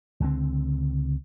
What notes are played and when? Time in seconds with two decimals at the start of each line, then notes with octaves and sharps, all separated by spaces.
0.20 C#2 D3 C4